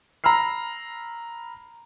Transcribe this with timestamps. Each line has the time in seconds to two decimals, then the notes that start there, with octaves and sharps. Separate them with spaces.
0.24 A#5 B5 E6 F6 C7